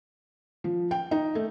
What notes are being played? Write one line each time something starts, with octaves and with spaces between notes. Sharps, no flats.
F3
G5
D#4
A3